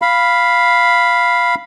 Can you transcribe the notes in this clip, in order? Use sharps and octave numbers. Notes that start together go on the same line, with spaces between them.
F5 B5